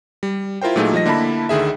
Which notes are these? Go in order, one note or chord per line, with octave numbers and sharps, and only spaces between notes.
G3
E4 F4 A#4 C5 G5
A#2 F#3 A3 D#4 F4 G#4
F3 G3 D#5 A#6
D3 A#3 E4 A5 B5
D2 D3 D#3 G#4 E5